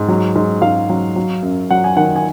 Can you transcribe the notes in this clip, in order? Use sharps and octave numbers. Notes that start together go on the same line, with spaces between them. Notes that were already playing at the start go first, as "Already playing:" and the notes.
Already playing: G#2
F#3
G#2
G#2 F5
F#3
F#3
F#2
F#3 F#5
G#5
D#3 F#5
G#5